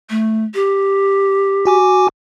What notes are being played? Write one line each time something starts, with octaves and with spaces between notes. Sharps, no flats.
A3
G4
F#4 G#5 D6